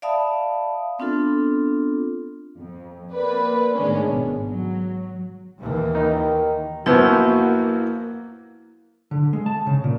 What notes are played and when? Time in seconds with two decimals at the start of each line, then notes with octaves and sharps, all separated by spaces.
0.02 D5 E5 F5 A5 B5 D#6
0.99 B3 C4 D4 F4 A4
2.57 F2
3.12 A#3 C4 B4 D5
3.74 A2 D#3 G#3 B3 C#4 D4
4.05 G#1 B2
4.47 F#3
5.59 D#2 E3
5.95 D#3 D#4
6.86 F#2 F3 A#3 B3 E4 F#4
9.11 D3
9.33 G#3
9.46 A5
9.67 C#3
9.84 A#2